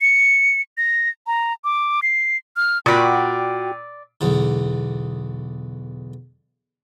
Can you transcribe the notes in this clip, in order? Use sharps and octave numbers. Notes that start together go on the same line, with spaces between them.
C#7
A#6
A#5
D6
C7
F6
A#2 F#4 D5 G5 B5
B1 E2 D3